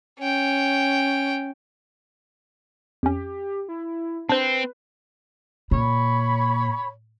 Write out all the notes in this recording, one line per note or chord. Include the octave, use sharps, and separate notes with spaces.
C#4 G5
F2 C#4 G4
E4
C4 D4 B4 C5
A#2 C#5 B5